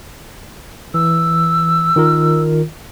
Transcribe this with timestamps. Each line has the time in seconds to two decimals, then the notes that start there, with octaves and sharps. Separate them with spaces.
0.94 E3 E6
1.96 D#3 F4 A#4